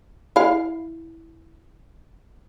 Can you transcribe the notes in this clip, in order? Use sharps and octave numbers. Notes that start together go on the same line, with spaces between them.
E4 F5